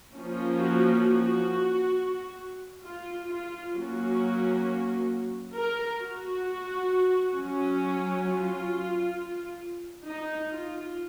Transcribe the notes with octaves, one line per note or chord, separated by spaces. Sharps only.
F3 A#3 C#4
F#4
F#4
F4
F4
F#3 A#3 C#4 F#4
A#4
F#4
F#3 C#4
F4
D#4
F4